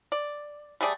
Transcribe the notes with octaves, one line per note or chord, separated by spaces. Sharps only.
D5
G3 A3 G#4 D5